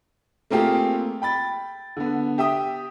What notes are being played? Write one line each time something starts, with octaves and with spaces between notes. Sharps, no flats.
A3 A#3 C4 F4 G4 G#4
G5 B5 A6
D3 B3
G4 E5 G5 D#6